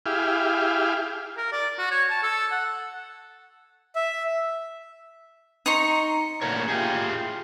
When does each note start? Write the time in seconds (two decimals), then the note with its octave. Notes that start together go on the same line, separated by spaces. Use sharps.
0.06 E4 G4 G#4 F5
1.37 A#4
1.52 D5
1.78 F#4
1.91 C#5
2.10 A5
2.23 A4
2.52 F#5
3.96 E5
5.66 D#4 A#5 C6 C#6
6.41 A#2 D3 E3 A3 A#4 C#5
6.68 F4 G4 G#4